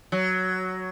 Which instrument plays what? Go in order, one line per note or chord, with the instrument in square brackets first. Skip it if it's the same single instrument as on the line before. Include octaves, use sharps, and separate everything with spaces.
[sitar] F#3